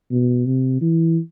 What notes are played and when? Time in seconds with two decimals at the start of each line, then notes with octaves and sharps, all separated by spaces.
0.11 B2
0.46 C3
0.82 E3